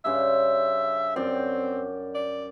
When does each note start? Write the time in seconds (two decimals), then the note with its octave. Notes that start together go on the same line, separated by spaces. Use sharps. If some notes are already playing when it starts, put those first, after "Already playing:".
0.05 G2 C#3 C5 E5
1.16 F#2 C4 D5 G5
2.15 D5